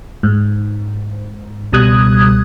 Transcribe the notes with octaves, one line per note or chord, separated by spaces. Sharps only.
G#2
C#2 B2 G3 D#6 F#6 G#6